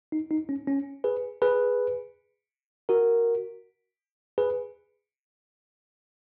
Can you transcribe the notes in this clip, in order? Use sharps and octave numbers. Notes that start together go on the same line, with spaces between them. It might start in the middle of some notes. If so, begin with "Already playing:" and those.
D#4
D#4
C#4
C#4
G#4 B4
G#4 B4
F#4 A#4
G#4 B4